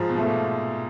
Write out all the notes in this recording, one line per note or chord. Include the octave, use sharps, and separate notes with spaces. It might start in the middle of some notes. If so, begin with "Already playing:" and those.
Already playing: G#2 F3
B2
A3
A#2